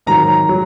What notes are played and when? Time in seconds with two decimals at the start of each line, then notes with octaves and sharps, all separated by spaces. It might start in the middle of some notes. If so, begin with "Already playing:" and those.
0.07 G#2 D#3 F#3 A#5
0.49 F#3